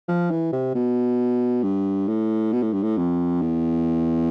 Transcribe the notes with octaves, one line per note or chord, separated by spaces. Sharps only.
F3
E3
C3
B2
G2
A2
B2
A2
G2
A2
F2
E2